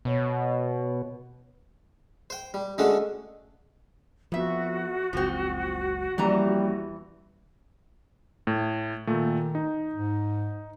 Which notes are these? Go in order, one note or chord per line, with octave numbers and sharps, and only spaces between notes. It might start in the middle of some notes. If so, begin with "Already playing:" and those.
B2 B3 C#5
C5 G5
G3
D3 G#3 A3 C#4 F#4
F2 F3 B3 F#4 E5
F#1 C#2 F3 C4
E2 E3 F3 G3 A#3 C#4 A#5
A2
A#2 D#3 A3
D#4
G#2